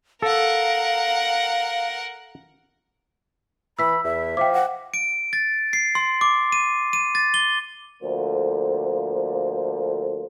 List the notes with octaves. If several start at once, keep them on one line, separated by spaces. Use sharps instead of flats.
A4 A#4 F5 F#5
E3 B5 E6 B6
E2 E5
F3 G5 D6
F#5
D7
A6
C7
C6
D6
D#7
D#7
A6
G7
D2 F3 A#3 A4 C5